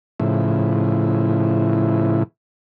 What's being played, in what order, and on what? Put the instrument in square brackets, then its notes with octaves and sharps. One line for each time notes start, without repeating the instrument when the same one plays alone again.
[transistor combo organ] A2 C#3 F3 E4